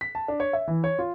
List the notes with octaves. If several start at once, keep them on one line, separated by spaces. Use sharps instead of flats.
B6
A5
D4
C#5
E5
E3
C#5
F4